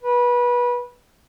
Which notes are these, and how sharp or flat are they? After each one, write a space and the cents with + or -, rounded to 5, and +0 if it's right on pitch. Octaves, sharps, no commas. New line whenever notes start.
B4 -25